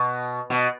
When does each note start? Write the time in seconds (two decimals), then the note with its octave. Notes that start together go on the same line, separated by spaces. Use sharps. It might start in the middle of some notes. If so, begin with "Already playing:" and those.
Already playing: B2
0.50 B2